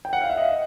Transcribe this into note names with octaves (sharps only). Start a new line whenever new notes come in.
G5
F#5
F5
E5
D#5